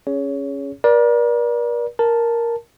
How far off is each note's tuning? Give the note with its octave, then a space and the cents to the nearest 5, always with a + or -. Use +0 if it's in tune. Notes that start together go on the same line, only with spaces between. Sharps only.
C#4 +0 G#4 +0 C#5 +20
A#4 +40 D5 +0
A#4 +0 A5 +0